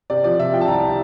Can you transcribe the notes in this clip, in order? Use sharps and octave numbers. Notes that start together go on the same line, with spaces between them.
C3 D5
F3 D5
C3 E5
F3 G5
A5
C2 A#5